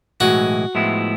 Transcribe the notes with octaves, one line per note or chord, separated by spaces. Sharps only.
B1 A2 E3 G#3 F#4
A2 F3 G#3 B3 E4